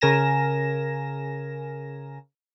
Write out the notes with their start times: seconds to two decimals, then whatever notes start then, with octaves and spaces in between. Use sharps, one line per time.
0.01 C#3 A#4 G#5 A#6 E7